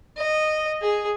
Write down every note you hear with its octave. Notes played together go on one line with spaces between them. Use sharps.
D#5
G#4